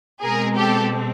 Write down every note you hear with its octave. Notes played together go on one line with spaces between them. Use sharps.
B2 G#3 C4 G#4 A#4
G4 A4